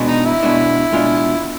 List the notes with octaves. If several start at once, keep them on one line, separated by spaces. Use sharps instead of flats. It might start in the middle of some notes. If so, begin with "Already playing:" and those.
Already playing: B2 G#3 B3 D4 F#4
D#4
E4
B2 G#3 B3 D4 F#4
B2 G#3 B3 D4 F4